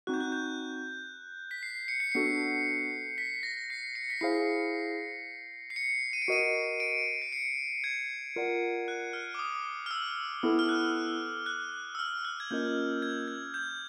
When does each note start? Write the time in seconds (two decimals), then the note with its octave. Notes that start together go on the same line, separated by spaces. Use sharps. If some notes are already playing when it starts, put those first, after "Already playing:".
0.07 C4 D#4 F#4 F#6
0.14 G6
0.20 F#6
0.32 G6
1.51 B6
1.63 C7
1.88 C#7
2.00 C7
2.12 B3 D4 F#4 A4 C#7
3.18 B6
3.43 A#6
3.70 C7
3.95 C#7
4.10 B6
4.21 E4 G#4 C5 F5 C7
5.70 C7
5.76 C#7
6.13 D#7
6.22 D7
6.28 F#4 A#4 D#5 D#7
6.80 D7
7.22 C7
7.32 C#7
7.84 G#6
8.36 F4 A#4 D5 F#5
8.88 F#6
9.13 F6
9.35 D6
9.39 D#6
9.86 F6
9.91 E6
10.43 B3 E4 A4
10.59 F6
10.69 F#6
11.46 F#6
11.95 E6
11.99 F6
12.25 F#6
12.40 G#6
12.51 A#3 C#4 F4 A#4 D#5 G6
13.02 G#6
13.28 G#6
13.54 G6